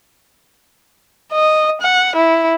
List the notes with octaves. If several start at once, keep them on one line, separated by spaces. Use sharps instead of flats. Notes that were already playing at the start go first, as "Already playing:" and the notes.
D#5
F#5
E4